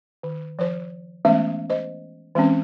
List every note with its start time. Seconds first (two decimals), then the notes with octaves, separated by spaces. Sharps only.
0.23 D#3
0.59 F3 C5
1.25 E3 G#3 A3 B3 C#4 E5
1.70 C5 D#5
2.35 E3 G#3 C4 C#4